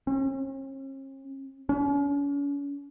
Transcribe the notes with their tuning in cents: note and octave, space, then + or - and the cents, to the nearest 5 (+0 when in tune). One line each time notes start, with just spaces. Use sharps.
C#4 -45
C#4 +40